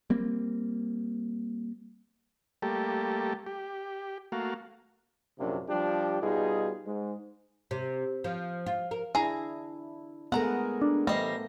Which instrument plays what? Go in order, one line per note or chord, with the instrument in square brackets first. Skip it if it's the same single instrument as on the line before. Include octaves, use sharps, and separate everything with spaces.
[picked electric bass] G3 A#3 C4
[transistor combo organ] G3 A3 A#3 G4 A4
G4
A3 A#3 F#4 F5
[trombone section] A#1 F#2 C3 A#3 D4
F3 G3 D4 G4
B2 G3 D#4 F4 G#4
G#2
[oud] C3
F3
F4
A#4
[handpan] D4 E4 [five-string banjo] G#4 A#5
[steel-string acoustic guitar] G#3 A3 G#4 [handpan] B3 A#4 [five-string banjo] F#5 A#5
[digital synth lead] D4
[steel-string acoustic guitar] E3 C5 F5 [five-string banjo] G3 D#5 [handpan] A3 [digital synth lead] A#6